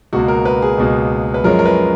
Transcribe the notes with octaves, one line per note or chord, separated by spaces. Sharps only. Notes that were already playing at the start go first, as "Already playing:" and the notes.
C#2 B2 A#3 F#4
A#4
B4
G#4
C#2 B2 A#3
B4
F#2 F3 G#3 C#4 A#4
A#4
B4